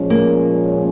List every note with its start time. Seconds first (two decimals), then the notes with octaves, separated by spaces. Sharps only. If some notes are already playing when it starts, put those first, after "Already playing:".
Already playing: A#2 F3 G#3 C#4
0.10 A#3